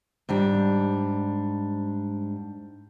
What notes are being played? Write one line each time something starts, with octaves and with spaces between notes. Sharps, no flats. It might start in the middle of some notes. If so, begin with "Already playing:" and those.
G#2 G3 D4